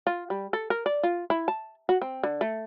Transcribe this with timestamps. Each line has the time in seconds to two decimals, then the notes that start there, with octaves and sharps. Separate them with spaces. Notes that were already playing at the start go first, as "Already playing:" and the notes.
0.07 F4
0.30 G3
0.53 A4
0.70 A#4
0.86 D5
1.03 F4
1.30 E4
1.48 A5
1.89 F#4
2.02 C4
2.23 D3
2.41 A3